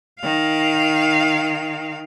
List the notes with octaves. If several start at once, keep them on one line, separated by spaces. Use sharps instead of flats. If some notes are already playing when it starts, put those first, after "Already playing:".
D#3 F5